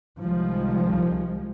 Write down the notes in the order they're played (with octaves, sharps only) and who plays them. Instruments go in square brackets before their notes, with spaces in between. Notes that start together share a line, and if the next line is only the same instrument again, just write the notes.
[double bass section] C2 D#3 F3 G3 G#3